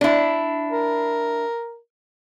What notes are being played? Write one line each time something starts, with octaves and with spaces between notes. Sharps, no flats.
D4 E4
A#4